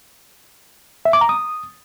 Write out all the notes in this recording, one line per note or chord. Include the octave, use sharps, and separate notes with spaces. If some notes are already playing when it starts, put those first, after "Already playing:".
E5
D6
A#5
D#6